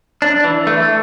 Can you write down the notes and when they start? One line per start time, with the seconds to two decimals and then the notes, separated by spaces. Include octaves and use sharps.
0.22 D4
0.44 E3
0.67 A3